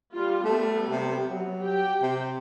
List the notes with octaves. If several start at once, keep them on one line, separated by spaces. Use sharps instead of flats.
G3 F4
G3 A3 B3
C3
F#3
G4 G5
C3